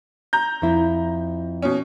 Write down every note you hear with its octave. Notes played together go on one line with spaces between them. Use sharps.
A#5 G6
F2 E4
B2 C#4